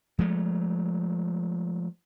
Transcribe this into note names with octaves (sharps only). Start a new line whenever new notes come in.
F3 G#3 A3